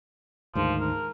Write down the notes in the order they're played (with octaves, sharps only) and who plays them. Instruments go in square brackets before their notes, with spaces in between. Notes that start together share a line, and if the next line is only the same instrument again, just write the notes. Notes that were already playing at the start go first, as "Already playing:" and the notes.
[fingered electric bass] D2 G#2 D#3 [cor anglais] F3
[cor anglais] A#4